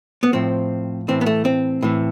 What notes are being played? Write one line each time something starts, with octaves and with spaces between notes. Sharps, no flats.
B3
A2 F3 C4
A2 E3 C4
B3
A3
C4
A2 E3